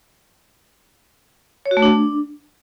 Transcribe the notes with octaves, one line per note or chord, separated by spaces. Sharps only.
C#5
F#4
A3
D4